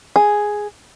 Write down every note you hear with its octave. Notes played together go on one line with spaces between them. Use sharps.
G#4